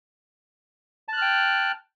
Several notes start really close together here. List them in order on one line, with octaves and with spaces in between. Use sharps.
A5 F#6 F6 G5